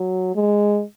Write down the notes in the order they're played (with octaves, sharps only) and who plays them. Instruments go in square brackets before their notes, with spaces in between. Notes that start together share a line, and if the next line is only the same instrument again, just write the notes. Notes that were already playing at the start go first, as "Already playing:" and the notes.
Already playing: [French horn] F#3
G#3